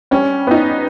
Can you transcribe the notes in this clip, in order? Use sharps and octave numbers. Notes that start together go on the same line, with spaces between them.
G3 C#4
B3 D#4